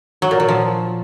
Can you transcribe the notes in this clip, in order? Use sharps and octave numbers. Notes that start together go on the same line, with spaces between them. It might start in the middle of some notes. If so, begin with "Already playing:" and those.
F#3
A#2
F#3
F3